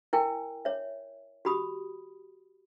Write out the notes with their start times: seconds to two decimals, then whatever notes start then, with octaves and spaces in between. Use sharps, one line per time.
0.13 E4 A#4 G5 G#5
0.65 C#5 E5
1.45 F#4 G4 B5 D#6